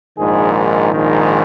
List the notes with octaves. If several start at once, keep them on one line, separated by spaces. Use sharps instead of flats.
A#1 G#2 D#3 G#4
A#1 G#2 D#3